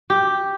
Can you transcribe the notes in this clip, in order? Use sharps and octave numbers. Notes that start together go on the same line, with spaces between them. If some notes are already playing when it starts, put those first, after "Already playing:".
G4